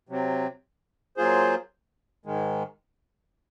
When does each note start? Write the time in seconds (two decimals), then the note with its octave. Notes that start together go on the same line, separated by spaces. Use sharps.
0.09 C3 F#3 C4
1.17 F#3 A#3 F4 G#4 C5
2.26 G#2 D#3 G#3